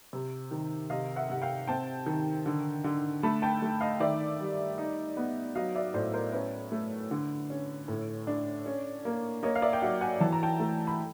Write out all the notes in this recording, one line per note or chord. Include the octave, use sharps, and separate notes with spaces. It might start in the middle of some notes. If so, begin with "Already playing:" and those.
C3
D#3
C3 D#5 F5
E5 F#5
C3 F#5
F5 G5
C4 G5 A5
D#3
D3
D3
A3 A5 B5
G5 A5
A3
D#5 F5
D#3 D5 E5
G3
D#4
B3
F#3 D#5 F5
D5 E5
A2 C5 D5
A#4 C5
C#4 B4
A3
D3
C#4
A2
D4
C#4
A#3
A#3 C#5 D#5
F5
D5 E5
G5
F#3 E5 F#5
F#5 G#5
E3 A5
A#5
G5 A5
A3
B5